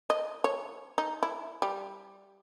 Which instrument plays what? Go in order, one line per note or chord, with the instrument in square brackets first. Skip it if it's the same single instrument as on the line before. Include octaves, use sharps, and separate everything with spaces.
[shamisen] D#5
C#5
D#4
E4
G3